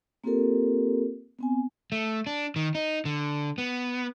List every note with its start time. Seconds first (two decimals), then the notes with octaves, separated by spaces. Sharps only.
0.24 A#3 C4 F4 G4 A4 A#4
1.39 B3 C4 G#5
1.92 A3
2.27 D4
2.56 D#3
2.75 D#4
3.05 D3
3.58 B3